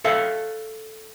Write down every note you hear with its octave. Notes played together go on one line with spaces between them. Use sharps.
A4 C5 C#5 E5 F5